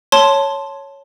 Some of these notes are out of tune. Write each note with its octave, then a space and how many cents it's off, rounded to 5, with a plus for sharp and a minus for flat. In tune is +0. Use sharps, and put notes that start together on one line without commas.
C#5 +0 A5 +0 C6 +0